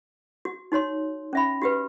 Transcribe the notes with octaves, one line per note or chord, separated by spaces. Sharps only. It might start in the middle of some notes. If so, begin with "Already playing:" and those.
F#4
D#4 F#4 C#5 C6
C#4 E5 B5
F#4 G4 B4